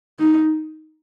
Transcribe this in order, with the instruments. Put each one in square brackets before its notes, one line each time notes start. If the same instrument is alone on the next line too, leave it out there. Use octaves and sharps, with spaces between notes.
[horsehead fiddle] D#4